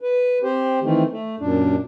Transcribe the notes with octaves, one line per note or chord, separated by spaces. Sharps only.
B4
C4 G4 C5
D#3 E3 A3 C4
A3
F#2 A#2 D4